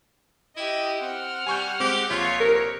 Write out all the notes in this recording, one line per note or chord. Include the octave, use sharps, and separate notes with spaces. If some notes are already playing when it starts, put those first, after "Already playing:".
E4 G4 D#5
C4 F#5 F6
G3 G#5 C#6 G6
G#3 C4 G4
A#1 F4 C#5 G6 B6
C3 A#4